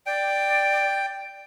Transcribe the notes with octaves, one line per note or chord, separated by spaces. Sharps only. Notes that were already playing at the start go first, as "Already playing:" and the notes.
D5 G5